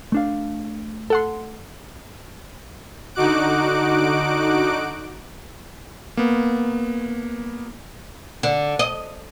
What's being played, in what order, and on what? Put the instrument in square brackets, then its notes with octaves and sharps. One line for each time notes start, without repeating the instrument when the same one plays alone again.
[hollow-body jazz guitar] A3 D4 F5
[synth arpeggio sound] A4 F#5 C6
[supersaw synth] D3 D#4 F#4 D6 F#6 D7
[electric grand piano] A#3 B3
[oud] D3
D#5